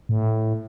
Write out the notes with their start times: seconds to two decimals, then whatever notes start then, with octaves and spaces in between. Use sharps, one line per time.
0.09 A2